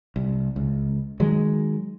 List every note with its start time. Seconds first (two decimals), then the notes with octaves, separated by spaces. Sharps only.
0.16 C2
0.56 C#2
1.20 D#3 F#3 G#3